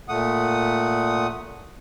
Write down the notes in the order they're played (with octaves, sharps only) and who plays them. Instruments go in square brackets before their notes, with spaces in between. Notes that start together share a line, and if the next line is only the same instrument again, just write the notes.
[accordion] A#2 A3 F#5 D#6